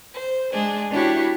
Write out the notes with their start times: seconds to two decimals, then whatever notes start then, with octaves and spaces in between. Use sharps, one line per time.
0.14 C5
0.53 G#3 D4 G#4
0.91 D4 E4 F#4 G4 C#5